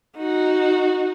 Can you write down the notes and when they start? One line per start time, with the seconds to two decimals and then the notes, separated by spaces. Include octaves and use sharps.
0.17 D#4 F#4